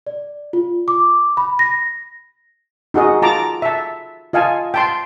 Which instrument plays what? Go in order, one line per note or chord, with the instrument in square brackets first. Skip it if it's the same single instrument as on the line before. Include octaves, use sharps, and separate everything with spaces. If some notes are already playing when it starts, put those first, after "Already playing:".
[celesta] D5
F4
D6
B5
A#6
[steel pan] D#4 F#4 G#4 D#5
F4 A5 A#5 D6
E5 A5
F4 D#5 F5 G#5 A5
G5 A5 C6